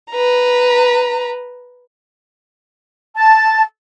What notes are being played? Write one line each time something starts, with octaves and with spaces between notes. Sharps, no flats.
B4 A#5
A5